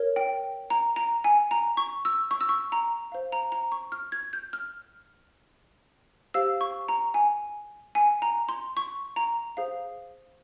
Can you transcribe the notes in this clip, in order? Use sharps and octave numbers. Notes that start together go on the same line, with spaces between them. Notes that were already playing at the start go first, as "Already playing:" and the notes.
Already playing: A#4 C#5
G5
A#5
A#5
G#5
A#5
C#6
E6
C#6
E6
C#6
A#5
C5 F5
A#5
A#5
C#6
F6
G#6
G6
F6
G4 C5 F5 E6
C#6
A#5
G#5
G#5
A#5
C6
C#6
A#5
G#4 C5 F5